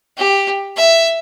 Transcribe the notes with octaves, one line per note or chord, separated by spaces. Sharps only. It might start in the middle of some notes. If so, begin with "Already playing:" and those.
G4
E5